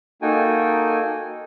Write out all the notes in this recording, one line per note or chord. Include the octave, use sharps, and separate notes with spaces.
A#3 D#4 F#4 A4 G5 G#5